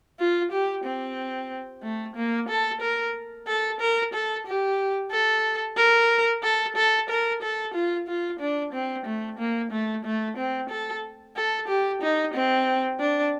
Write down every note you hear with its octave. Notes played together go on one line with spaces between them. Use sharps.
F4
G4
C4
A3
A#3
A4
A#4
A4
A#4
A4
G4
A4
A#4
A4
A4
A#4
A4
F4
F4
D4
C4
A3
A#3
A3
A3
C4
A4
A4
G4
D#4
C4
D4